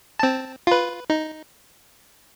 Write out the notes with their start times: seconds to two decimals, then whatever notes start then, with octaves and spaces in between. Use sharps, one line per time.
0.19 C4 A5
0.67 F4 B4
1.10 D#4